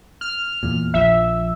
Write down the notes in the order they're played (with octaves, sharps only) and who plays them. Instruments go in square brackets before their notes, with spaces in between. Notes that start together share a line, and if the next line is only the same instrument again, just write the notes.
[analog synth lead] F6
[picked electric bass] E2 A#2
[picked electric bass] A#1 F3 [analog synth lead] E5